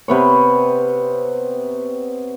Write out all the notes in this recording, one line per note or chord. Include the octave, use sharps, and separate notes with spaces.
C3 B3 C#5